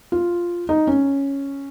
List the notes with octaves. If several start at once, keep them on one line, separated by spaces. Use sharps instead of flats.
F4
D#4
C#4